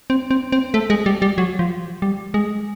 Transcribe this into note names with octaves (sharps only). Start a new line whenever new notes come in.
C4
C4
C4
A3
G#3
G3
G3
F#3
F3
G3
G#3